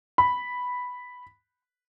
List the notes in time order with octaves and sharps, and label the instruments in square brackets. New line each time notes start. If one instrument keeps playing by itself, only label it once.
[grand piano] B5